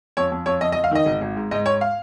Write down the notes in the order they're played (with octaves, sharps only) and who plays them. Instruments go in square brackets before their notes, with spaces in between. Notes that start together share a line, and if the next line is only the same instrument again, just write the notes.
[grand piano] F2 C#5
F2
F2 C#5
F2 D#5
D#5
F2
F5
D#3 D#5
G#1
G#1
G#2
G#2 D#5
G#2 C#5
F5